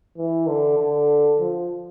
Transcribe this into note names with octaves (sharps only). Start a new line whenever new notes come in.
E3
D3
D3
F3